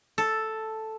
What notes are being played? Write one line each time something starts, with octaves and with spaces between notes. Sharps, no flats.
A4